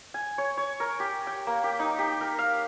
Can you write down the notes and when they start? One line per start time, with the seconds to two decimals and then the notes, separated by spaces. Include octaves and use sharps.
0.14 G#5
0.38 C#5
0.57 C#5
0.80 A#4
1.00 G4
1.27 G5
1.47 A#3
1.64 G4
1.79 D#4
1.99 G4
2.21 A#4
2.39 F5